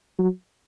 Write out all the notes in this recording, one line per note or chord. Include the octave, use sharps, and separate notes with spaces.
F#3